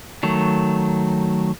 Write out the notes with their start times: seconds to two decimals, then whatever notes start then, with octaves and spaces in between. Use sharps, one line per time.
0.23 D#3 F#3 A3